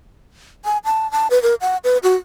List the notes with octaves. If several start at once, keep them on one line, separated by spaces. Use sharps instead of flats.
G#5
A5
A5
B4
A#4
F#5
B4
F#4